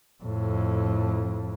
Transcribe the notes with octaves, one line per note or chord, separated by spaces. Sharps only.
F2 A2